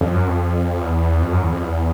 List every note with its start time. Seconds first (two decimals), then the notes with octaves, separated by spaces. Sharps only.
0.01 F2
0.14 F#2
0.27 F2
0.81 E2
1.22 F2
1.32 F#2
1.42 E2
1.52 F2
1.63 E2